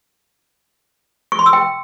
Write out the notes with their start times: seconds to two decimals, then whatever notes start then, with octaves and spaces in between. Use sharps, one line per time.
1.32 C#6
1.39 C6
1.46 E6
1.53 G5